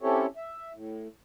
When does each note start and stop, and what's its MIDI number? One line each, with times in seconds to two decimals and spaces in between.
0.02 0.26 60
0.02 0.26 61
0.02 0.26 64
0.02 0.26 67
0.02 0.26 69
0.02 0.26 73
0.36 0.73 76
0.74 1.08 45